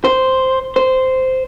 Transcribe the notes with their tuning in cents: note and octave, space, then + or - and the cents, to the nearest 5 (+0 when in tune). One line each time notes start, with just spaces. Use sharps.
C5 -5
C5 -10